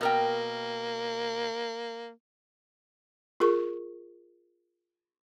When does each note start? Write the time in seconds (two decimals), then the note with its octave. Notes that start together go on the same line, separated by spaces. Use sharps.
0.01 B2 A#3 A#4 G5
3.40 F4 G#4 A#4 C#6